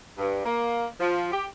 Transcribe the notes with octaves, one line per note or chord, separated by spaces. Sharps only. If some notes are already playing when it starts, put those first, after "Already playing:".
G2
A#3
F3
G4